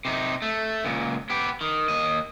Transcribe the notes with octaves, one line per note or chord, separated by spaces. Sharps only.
C3 D#4
A3
C#2 A#2
B3 G4
D#3
D#2 D#5